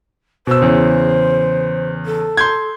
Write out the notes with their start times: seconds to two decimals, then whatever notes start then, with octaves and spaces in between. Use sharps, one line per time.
0.47 B2 C5 E6
0.62 E2 C#3
2.06 A4
2.37 C6 G6 G#6